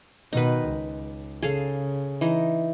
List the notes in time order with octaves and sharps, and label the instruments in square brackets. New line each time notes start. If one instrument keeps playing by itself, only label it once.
[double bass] B2 D#3 [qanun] D#4 B4
[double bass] C#2
[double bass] C#3 [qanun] G#4 A4 F5
[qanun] E3 D#4